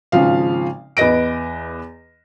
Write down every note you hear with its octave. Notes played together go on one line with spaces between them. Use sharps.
G#1 C#3 F3 F5
E2 B4 D#5 A#6 D7